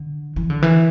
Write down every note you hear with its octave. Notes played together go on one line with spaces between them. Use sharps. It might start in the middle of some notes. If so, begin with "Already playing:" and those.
Already playing: D3
E3
D3
E3